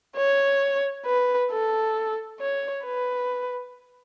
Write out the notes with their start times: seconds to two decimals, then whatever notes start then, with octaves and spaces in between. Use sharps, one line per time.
0.17 C#5
1.06 B4
1.51 A4
2.40 C#5
2.85 B4